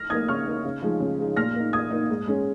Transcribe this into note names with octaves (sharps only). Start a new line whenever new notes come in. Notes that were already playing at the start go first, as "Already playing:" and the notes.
Already playing: F6 A#6
A#3 D#4 D#6 G#6
C#3 C#6 F6
A#3 D#4
C#3
F3 G#3 D#4
C#3
F3 G#3 D#4
A#2 F6 A#6
A#3
D#4
A#2 D#6 G#6
A#3 D#4
G#2
G#3 C#4